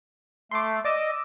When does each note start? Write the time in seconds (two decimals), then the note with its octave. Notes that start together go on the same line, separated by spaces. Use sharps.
0.51 A3 C6 D6
0.85 D5 D#5 D6 E6